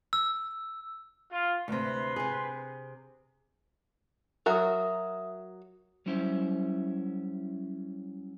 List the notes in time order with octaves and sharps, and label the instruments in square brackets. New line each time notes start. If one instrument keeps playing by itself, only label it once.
[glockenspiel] E6
[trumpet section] F4
[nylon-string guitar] D2 C3 [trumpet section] B4 C6
[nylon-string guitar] C3 G#4
[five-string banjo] F#3 F#4 A#4 [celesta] E5 D#6
[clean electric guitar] F#3 G3 C#4 E4 C5